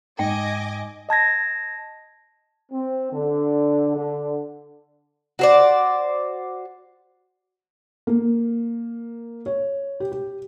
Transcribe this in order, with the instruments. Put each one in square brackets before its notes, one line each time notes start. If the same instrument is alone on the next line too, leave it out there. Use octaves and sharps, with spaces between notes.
[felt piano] G#2 [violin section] D#5 G#5 D6 [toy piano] G5
[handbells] D#5 A5 G#6 A#6
[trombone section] C4
D3
D3
[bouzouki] F#4 C5 D5
[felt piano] A#3
C#5
G4
G4